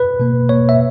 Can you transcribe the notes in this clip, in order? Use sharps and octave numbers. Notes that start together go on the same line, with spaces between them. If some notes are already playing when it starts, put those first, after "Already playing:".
Already playing: B4
B2 A#3
B2 A#3 C#5
E5